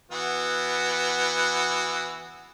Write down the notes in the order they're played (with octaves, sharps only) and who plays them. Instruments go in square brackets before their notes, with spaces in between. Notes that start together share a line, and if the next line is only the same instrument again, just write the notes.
[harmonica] E3 B3 F#4